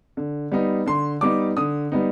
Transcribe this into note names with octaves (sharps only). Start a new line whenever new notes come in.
D3
G3 B3 D#4
D3 C6
G3 B3 D#4 D6
D3 D#6
G3 B3 D#4